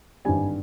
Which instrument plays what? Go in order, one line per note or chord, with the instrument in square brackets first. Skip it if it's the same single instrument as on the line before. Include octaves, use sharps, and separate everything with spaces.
[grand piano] G#1 G2 D3 G3 G#5